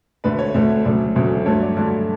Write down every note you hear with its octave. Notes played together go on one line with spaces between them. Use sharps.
D2 D3 A3 B4
C#5
D2 D3 A3
D2 C#3 F#3 A3 D5
D2 C#3 F#3 A3
G2 D3 F#3 A3 C#5
D5
G2 D3 F#3 A3 D5